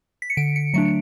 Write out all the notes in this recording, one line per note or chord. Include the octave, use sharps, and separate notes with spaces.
B6
C#7
D3 D7
C#7
F#3 A3 D4 C#7